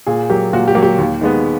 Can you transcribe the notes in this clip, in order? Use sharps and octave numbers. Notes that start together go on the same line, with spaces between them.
A#2 G#4
F#3 A#3 G4
A#2 F#4
G4
F#3 A#3
G4
D#2
D#3 G#3 B3